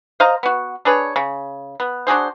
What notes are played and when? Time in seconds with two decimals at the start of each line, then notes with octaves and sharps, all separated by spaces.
0.20 C5 D#5 F5 A#5
0.43 B3 F#4
0.85 D4 G#4 B4 C#5
1.16 C#3
1.80 B3
2.07 D4 F#4 G#4 C5